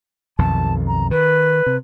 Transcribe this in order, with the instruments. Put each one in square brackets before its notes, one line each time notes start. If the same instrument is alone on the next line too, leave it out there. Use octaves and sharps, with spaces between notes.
[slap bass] B1 F2 D#3 [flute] A5
[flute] A#5
[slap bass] D#3 [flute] B4
[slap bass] C3